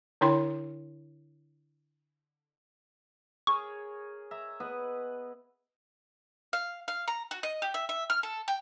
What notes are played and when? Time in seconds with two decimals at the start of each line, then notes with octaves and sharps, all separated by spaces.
0.21 D3 D4 E4 C#5 G5 C6
3.47 G#4 A#4 C#5 C#6
4.31 E5 A#5
4.60 B3 B4 D#5
6.53 F5
6.88 F5
7.08 A#5
7.31 F#4
7.43 D#5
7.62 G4
7.74 E5
7.89 E5
8.10 F6
8.23 A4
8.48 G5